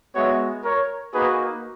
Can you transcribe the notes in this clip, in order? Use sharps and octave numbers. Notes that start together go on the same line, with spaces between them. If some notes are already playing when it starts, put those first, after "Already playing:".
G#3 B3 F#4 C#5 E5
A#4 C#5
A#3 D#4 F#4 G#4 B4